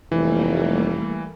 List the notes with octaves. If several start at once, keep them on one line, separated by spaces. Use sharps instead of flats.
F1 E3 G3 A3 A#3